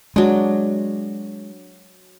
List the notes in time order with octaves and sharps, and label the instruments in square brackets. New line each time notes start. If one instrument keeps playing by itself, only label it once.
[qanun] F#3 D4 [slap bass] G#3